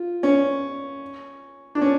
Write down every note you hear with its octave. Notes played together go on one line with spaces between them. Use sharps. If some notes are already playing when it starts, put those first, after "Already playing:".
Already playing: F4
C#4
D4
C#4